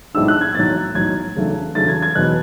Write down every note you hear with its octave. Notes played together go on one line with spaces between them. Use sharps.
B1 A2 G#3 D4 E6
F#6
G#6
B1 A2 F#3 A6
B1 A2 F#3 G#6
E2 C#3 F#3 A3 D4
E2 C#3 F#3 A3 D4 A6
G#6
G#6
E2 B2 F#3 B3 F#6